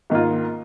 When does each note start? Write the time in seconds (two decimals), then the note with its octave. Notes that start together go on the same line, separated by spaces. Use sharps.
0.10 G#2 D#3 A#3 F4